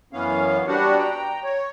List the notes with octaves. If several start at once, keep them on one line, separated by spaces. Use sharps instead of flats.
F#2 E3 B3 C#4 F5
G3 B3 D4 F#4 G4 F#5
G5 A#5
C#5